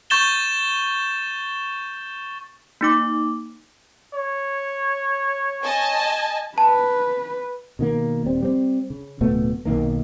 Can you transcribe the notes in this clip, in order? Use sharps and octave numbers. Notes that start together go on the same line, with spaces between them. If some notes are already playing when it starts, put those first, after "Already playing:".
C#6 G6 A6 E7 G7
A#3 D#4 D6
C#5
D#5 G#5 A5
B4 A5
B2 D#3 A#3
D#1 G3 C4
G3 C4
C#3
D1 B2 A3 B3
B1 F2 D#3 A#3